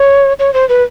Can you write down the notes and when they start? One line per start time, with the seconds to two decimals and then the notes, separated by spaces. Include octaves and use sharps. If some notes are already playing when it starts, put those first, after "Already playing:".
Already playing: C#5
0.39 C#5
0.54 C5
0.69 B4